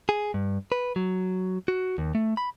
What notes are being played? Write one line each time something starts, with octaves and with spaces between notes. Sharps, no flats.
G#4
G2
B4
F#3
F#4
D#2
A3
B5